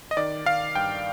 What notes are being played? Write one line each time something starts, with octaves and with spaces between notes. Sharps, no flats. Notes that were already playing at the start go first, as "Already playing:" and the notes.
D#5
D#3 D5
D#3 F5
G2 G5